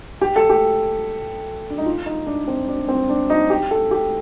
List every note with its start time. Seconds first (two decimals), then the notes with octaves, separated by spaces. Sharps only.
0.21 G4
0.36 A4
0.50 G4
1.70 D4
1.78 D#4
1.86 F4
2.06 D#4
2.26 D4
2.48 C4
2.68 D4
2.89 C4
3.09 D4
3.30 D#4
3.50 G4
3.71 A4
3.91 G4